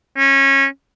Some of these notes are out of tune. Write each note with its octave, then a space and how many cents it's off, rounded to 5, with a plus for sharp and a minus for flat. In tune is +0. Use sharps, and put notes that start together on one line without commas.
C#4 -25